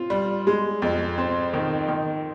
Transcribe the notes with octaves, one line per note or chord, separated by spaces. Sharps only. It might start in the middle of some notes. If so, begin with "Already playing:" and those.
Already playing: C4 F4
G3
G#3
F2
C4
D#3
D#3